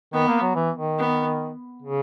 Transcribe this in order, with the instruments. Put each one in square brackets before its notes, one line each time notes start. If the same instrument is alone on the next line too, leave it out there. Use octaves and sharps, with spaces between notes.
[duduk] D#3 [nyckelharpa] B3
[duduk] A#3
F#3
E3
D#3
[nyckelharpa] B3
[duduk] C#3